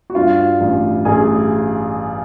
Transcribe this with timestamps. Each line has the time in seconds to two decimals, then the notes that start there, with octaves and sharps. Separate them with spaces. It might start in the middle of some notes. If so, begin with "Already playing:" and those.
0.10 F#4
0.15 G2 F4
0.61 A1
1.05 A1 G#4